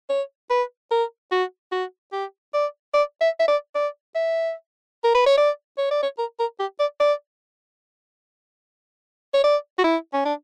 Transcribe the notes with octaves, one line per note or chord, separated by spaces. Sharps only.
C#5
B4
A#4
F#4
F#4
G4
D5
D5
E5
E5
D5
D5
E5
A#4
B4
C#5
D5
C#5
D5
C#5
A#4
A#4
G4
D5
D5
C#5
D5
F#4
E4
C#4
D4